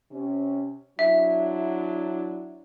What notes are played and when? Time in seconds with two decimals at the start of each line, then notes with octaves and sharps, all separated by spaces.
0.11 C3 C#4
0.99 F#3 D4 E4 E5